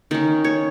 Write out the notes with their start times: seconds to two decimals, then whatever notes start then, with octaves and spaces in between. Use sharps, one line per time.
0.11 D#3 C#4 A#4
0.44 C#5